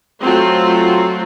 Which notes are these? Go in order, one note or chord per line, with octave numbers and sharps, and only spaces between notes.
F#3 A3 C4 F4 F#4